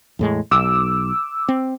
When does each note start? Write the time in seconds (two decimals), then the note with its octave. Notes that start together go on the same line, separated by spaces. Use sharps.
0.19 E2 A2 G#3
0.51 B1 D6 E6
1.49 C4